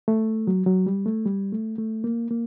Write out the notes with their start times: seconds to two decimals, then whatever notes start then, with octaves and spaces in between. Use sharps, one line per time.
0.08 A3
0.47 F#3
0.66 F#3
0.86 G3
1.06 A3
1.26 G3
1.52 A3
1.78 A3
2.04 A#3
2.31 A#3